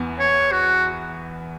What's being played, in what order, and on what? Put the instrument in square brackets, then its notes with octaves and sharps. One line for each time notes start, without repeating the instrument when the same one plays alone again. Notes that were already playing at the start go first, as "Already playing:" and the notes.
Already playing: [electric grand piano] E2 E3 B3
[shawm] C#5
F#4